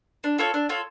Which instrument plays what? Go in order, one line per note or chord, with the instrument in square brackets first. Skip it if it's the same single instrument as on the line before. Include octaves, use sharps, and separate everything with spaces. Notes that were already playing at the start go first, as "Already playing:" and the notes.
[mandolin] D4
F4 A4 C#5
D4
F4 A4 C#5